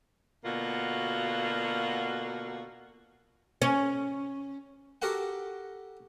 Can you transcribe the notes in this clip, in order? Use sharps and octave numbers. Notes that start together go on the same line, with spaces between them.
B2 D3 A#3 F4 F#4
C#4
F#4 G4 A4 A#4 F#5 G5